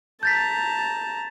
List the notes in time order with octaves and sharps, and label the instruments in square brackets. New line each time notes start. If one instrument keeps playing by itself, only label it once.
[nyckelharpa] A5 A#5 [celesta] G6 A6 B6